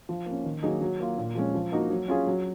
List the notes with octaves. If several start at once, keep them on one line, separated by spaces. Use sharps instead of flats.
F3
A#3 C#4
D#3
F#3 A#3 D#4 G#4
F#3
A#3 F4
A#2
F3 G#3 C#4
F3
A#3 D#4 F#4
F#3
C#4 F4 G#4
F#3